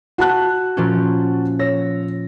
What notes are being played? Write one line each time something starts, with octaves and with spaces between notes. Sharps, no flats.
F#4 A5 F#6
A#2 F3 C#4
C#5 E6 A#6